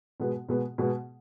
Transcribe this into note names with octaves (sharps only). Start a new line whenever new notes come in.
B2 G#3 B3
B2 G#3 B3
B2 G#3 B3